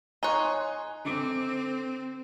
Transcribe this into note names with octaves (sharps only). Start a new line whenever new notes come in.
D#4 C#5 G#5 C6 F#6
D3 C4 D6 D7